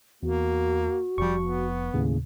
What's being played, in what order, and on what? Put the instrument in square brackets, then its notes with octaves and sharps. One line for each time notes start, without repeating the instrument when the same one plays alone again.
[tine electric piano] E2 [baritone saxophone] A#3 [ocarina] F#4
[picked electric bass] F1 F3 [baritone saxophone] G3 [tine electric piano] C#6
[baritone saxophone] B3
[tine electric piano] D#2 A2 C#3